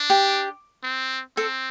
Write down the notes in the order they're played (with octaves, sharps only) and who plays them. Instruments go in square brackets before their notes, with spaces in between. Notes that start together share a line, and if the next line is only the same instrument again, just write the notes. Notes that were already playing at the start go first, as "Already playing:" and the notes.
Already playing: [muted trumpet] D4
[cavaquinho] G4
[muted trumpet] C4
[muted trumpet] C4 [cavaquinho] A4